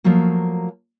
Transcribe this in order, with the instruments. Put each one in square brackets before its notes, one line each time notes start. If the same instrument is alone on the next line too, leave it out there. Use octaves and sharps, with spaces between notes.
[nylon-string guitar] F3 F#3 A3 A#3 F#4